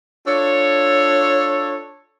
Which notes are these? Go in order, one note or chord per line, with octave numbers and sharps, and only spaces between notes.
D4 F4 A4 C#5